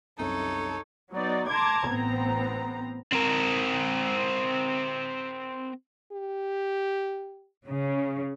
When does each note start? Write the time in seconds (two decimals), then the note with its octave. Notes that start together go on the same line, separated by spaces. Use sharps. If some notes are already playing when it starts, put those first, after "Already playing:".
0.19 C2 F#2 C3 D#4 A4 C#5
1.12 F#3 B3 D#4 D5
1.48 A5 A#5 C6 D6 G#6
1.90 A1 B3 C4 A#5
3.12 C4 A#4
6.12 G4
7.67 C#3